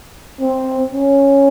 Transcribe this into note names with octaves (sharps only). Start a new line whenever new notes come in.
C4
C#4